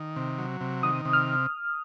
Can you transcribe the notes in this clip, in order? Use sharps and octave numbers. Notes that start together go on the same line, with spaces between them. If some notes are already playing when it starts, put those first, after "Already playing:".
Already playing: D#3
C3
F#3
C3
D#3 D#6
C3
F6